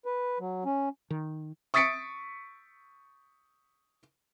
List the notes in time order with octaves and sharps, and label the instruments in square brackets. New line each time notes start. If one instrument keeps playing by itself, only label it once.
[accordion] B4
F#3
C#4
[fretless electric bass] D#3
[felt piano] C#6 D#6 A6 B6 C#7 D7